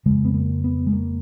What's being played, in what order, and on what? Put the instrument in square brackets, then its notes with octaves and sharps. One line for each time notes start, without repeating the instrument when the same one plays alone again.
[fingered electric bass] F2 C#3 G#3
B3
A#3
B3
G#3
A#3